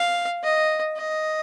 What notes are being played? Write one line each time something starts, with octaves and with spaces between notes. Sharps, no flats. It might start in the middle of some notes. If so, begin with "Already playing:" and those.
Already playing: F5
D#5
D#5